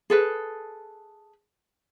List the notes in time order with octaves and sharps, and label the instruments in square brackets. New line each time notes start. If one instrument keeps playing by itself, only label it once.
[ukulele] G#4 A4 B4